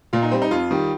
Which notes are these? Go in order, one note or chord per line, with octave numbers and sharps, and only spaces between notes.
A#2 F4
D#4
G3 C4
D#4
F2 F4
D#3 G3